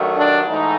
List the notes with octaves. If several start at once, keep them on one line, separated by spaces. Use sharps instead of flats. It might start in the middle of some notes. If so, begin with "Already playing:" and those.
Already playing: G2 D#3 F#3 A3
D4
G#2 E3 A3 D#4